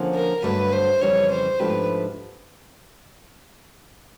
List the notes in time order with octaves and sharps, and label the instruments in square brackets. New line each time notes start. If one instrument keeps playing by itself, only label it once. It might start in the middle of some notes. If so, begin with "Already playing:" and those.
Already playing: [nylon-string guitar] D3 F3 A#3 C#4 F4
[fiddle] A#4
[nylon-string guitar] G2 D3 F#3 A3 [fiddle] B4
[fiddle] C5
[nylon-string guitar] F2 C#3 E3 G3 [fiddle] C#5
[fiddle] C5
[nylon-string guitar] G#2 F3 A3 D4 G4 [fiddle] B4